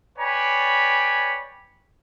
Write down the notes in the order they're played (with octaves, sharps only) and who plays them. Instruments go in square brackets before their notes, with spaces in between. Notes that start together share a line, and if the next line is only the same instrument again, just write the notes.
[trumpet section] B4 C#5 D5 G5 G#5 B5